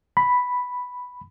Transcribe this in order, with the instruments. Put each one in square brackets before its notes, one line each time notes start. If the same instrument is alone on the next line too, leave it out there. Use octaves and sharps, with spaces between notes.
[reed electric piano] B5